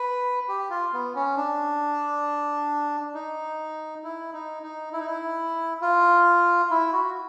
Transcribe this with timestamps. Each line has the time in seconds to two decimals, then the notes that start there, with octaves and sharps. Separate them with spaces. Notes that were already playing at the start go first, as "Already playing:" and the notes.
Already playing: B4
0.49 G4
0.70 F4
0.93 B3
1.15 C#4
1.37 D4
3.15 D#4
4.04 E4
4.33 D#4
4.63 D#4
4.93 E4
5.00 D#4
5.06 E4
5.81 F4
6.71 E4
6.93 F#4